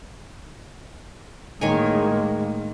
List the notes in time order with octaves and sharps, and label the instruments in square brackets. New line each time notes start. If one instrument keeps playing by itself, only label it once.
[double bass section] A2 G#3 A#3 [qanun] D#3 C#5 G#5